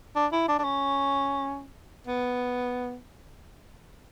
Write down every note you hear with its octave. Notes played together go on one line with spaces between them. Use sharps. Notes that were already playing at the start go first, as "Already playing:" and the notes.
D4
E4
D4
D4
C#4
B3